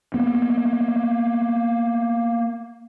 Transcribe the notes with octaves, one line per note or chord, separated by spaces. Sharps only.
A#3 B3